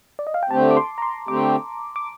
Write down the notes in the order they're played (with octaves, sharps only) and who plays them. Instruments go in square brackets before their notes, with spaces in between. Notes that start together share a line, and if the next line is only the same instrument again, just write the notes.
[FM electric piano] D5
D#5
F5
G5
[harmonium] D3 A3 C4 G4 [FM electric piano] A5
[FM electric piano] D6
C6
A#5
C6
[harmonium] D3 A3 C4 G4 [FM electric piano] D6
[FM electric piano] D6